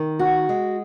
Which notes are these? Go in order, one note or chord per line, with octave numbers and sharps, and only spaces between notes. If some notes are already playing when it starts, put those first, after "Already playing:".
Already playing: D#3
F#4
G#3